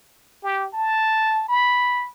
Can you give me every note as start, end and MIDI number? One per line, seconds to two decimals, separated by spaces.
0.43 0.68 67
0.74 1.44 81
1.49 2.09 83